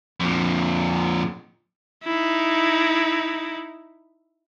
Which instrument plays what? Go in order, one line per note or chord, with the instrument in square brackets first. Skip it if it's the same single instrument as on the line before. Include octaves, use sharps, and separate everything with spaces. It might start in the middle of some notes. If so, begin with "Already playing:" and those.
[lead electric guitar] F2 A#2
[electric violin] D#4 E4